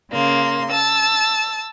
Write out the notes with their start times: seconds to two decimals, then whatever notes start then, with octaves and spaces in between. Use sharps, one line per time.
0.11 C#3 A#3 C6
0.68 A5 E6